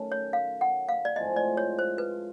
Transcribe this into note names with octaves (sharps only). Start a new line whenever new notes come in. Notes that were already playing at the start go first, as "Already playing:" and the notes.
Already playing: D#3 F#3 A3 C#4
C#5
F5
F#5
F5
D5
A2 F3 G#3 C4 D#5
D5
C#5
C5
B4